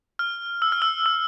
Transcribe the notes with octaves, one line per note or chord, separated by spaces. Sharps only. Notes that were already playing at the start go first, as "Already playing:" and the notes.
F6
E6
F6
E6
E6